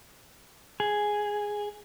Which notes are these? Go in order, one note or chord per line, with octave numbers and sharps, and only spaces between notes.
G#4